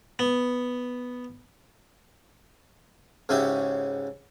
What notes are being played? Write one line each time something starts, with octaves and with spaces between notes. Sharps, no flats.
B3
G#2 C#3 C#4 E4 F#4 G4